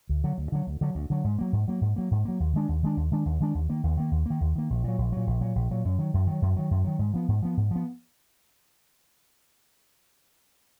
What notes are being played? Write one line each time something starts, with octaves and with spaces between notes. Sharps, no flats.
D2
D3 F#3
D2
D3 F#3
D2
D3 F#3
D2
D3 F#3
G#2
F#3 A#3
G#2
F#3 A#3
G#2
F#3 A#3
G#2
F#3 A#3
D#2
D#3 G#3 D4
D#2
D#3 G#3 D4
D#2
D#3 G#3 D4
D#2
D#3 G#3 D4
D#2
D#3 A#3
D#2
D#3 A#3
D#2
D#3 A#3
D#2
D#3 A#3
A#1
A#2 F#3
A#1
A#2 F#3
A#1
A#2 F#3
A#1
A#2 F#3
F#2
D#3 F#3
F#2
D#3 F#3
F#2
D#3 F#3
F#2
D#3 F#3
G#2
F3 B3
G#2
F3 B3
G#2
F3 B3